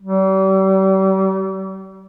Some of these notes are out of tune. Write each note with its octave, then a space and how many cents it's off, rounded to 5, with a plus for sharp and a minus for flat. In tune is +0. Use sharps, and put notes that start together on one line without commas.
G3 -40